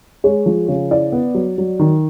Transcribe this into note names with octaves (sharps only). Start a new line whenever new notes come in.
G#3 C#5
F3
C#3
E4 D5
B3
F#3
F#3
D#3